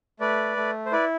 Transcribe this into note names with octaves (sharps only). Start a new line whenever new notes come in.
A3 B4 D5
A3
C5
E4 B4 D5